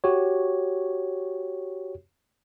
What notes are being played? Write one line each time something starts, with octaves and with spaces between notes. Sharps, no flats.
F#4 G4 C#5